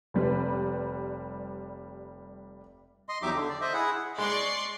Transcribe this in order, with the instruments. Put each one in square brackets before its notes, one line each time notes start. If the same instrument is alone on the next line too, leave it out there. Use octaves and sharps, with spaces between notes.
[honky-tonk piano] F1 G3 B4
[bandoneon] D#5 C6
E2 F#3 D#4 G4 E5 D6
D3
D5
C5 D#5 E5
E4 G#4 F#5
[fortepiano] G#3 [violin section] D5 C6 C#6